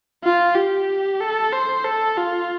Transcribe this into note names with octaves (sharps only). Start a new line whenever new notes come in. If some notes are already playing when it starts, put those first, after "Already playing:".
F4
G4
A4
C5
A4
F4